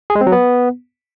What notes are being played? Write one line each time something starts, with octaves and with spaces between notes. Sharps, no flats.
G#4
G#3
C4
F#3
B3